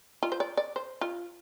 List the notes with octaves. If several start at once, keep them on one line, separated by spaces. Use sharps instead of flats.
F4
C5
D5
D5
C5
F4